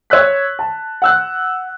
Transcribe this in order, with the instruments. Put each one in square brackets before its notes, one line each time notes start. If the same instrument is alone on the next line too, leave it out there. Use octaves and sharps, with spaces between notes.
[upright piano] C#5 E6 F#6 B6
A5
F#5 E6 F#6